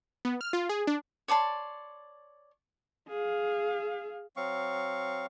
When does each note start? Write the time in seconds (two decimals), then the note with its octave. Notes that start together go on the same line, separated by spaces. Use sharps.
0.25 B3
0.41 F6
0.53 F4
0.69 G#4
0.87 D4
1.28 C#5 D5 A5 C6
3.09 G#4 F5
4.37 F#3 C4 F5 C#6